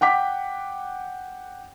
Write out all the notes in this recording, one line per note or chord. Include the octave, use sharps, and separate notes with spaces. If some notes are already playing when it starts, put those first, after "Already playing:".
F#5 G5 D6 B6